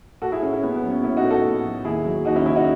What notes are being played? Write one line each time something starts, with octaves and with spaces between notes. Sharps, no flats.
A2 F#4 A4
E4 G#4
A3 C#4
C#4
A2 B3
B3
F#3
C#4
A2 C#4 E4
D#4 F#4
A3
F#4 A4
A2
F#3
D#2 E4 G#4
F#3
D#2 D#4 F#4
C#4 E4
C#3 C#4 E4
D#4 F#4